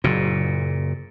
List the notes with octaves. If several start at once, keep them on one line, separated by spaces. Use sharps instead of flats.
F#1 A#2